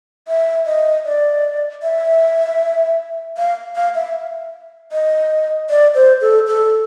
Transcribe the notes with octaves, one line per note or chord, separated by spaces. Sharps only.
E5
D#5
D5
E5
F5
F5
E5
D#5
D5
C5
A4
A4